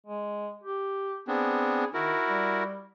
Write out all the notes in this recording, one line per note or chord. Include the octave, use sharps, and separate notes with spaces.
G#3
G4
B3 C4 D4 G#4
D#3 E4 F#4 A#4
G3